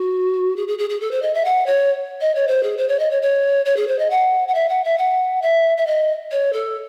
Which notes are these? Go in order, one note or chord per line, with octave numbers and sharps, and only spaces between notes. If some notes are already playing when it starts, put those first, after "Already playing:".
Already playing: F#4
G#4
G#4
G#4
G#4
A4
C5
D#5
E5
F#5
C#5
D#5
C#5
C5
G#4
C5
C#5
D#5
C#5
C#5
C#5
G#4
C5
D#5
F#5
F#5
E5
F#5
E5
F#5
E5
E5
D#5
C#5
A4